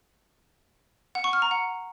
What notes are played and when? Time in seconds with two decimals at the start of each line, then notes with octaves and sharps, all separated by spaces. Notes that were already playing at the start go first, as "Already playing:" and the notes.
1.15 F#5
1.24 C#6
1.33 F6
1.42 A#5
1.51 F#5